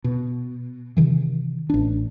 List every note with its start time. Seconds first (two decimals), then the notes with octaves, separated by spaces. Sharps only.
0.04 B2
0.97 C3 D#3 E3
1.70 A1 D4